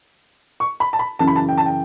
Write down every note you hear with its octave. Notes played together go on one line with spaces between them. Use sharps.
C#6
B5
A5
B5
F#2 C#3 E3 A5
B5
A5
G5
A5
G5